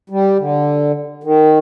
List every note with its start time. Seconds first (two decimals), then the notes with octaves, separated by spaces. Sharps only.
0.10 G3
0.39 D3
1.24 D#3